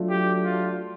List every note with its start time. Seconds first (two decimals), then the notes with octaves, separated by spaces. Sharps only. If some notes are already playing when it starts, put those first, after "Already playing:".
Already playing: F#3 A3 D4 F4
0.09 G4
0.44 F4